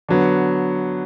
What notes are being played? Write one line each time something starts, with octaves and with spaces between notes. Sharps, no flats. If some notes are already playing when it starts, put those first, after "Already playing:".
D3 F#3 B3